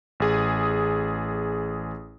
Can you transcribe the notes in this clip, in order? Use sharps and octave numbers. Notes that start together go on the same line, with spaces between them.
A1 G#4 D#6